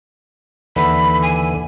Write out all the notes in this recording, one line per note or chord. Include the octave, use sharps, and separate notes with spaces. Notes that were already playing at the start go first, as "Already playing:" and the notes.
D#2 D3 E3 B5
G#5